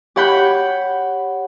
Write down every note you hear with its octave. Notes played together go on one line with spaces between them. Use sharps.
G4 C#5 F#5 B5 G6